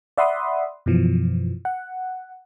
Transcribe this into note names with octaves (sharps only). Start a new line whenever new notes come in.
D5 E5 F#5 B5 C6 D#6
F#2 B2 E3 F3
F#5